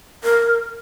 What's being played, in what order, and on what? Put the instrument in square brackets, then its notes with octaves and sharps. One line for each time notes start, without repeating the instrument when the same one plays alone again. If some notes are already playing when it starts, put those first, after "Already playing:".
[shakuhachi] A#4